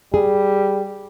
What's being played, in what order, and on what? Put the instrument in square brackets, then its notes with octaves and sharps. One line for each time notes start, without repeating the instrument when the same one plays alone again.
[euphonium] G3 [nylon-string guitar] G#4